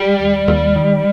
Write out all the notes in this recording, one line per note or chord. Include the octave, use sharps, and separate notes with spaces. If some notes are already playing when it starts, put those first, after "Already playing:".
Already playing: G3
D#2
D#2
D#3